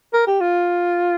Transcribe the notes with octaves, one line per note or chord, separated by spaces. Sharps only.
A#4
G4
F4